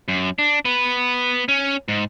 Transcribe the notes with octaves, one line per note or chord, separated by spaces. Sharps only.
F#2
D4
B3 B4
C#4
G#2